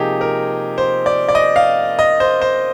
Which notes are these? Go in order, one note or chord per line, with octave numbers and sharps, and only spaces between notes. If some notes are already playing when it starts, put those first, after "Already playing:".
Already playing: C3 F3 A#3 D#4 G4 G#4
A#4
C5
D5
D5
D#5
F5
D#5
C5
C5